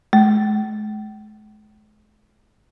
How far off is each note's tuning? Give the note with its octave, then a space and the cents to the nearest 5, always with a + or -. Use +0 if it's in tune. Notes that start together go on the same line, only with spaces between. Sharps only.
G#3 +45